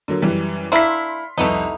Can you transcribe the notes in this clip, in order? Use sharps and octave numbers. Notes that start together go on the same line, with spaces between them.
D3 F#3 A#3
F#2 E3 G3
A#3 D4 E4 C6 F6 B6
C2 F2 A3 B3 D#4